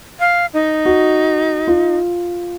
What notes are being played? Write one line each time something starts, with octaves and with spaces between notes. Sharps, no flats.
F5
D#4
F#4
F4